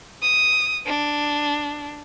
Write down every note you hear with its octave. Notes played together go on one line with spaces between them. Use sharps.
D#6
D4